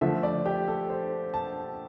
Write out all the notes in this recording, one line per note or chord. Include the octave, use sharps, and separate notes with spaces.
D3 F3 A3 E5
D5
G4
A4
C5
A5